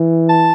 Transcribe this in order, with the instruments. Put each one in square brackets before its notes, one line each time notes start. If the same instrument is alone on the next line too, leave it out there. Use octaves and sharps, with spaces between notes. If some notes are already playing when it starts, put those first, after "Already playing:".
Already playing: [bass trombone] E3
[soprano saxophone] A5